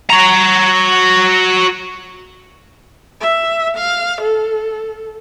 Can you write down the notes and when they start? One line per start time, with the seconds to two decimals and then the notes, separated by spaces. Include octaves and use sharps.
0.10 F#4 A#5
3.21 E5
3.77 F5
4.21 A4